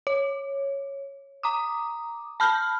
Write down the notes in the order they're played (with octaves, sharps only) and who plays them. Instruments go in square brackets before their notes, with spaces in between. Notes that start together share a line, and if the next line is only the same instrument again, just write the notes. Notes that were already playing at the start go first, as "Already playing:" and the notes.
[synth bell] C#5
A#5 D6 D#6
A5 B5 F6 G6